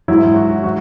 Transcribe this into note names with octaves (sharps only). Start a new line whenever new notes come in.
G#2 F#3 E4
F#4
F#3 F#4